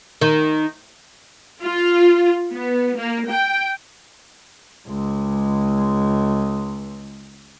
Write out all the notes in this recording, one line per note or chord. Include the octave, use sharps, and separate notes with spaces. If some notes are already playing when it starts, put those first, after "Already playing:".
D#3
F4
B3
A#3
G5
C#2 G#3